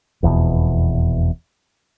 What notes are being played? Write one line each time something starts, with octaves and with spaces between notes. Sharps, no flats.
F1 E2 G2 B2